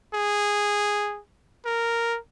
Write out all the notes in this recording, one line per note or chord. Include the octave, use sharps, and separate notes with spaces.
G#4
A#4